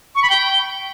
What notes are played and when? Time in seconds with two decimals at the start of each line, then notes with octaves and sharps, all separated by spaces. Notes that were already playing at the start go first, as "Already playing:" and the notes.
0.15 C#6
0.23 B5
0.30 G5